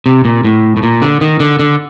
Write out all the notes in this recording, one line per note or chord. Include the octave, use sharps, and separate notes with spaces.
C3
A#2
A2
A2
A#2
D3
D#3
D3
D3